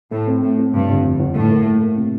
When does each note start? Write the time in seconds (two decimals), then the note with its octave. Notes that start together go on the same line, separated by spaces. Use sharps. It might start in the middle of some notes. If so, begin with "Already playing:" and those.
0.11 A2 A3
0.27 C4
0.42 A2 A3
0.58 C4
0.73 G2 C3
0.89 G1
1.04 F2
1.19 G1
1.35 A2 A4
1.50 A#3
1.66 A4
1.81 A#3
1.96 C3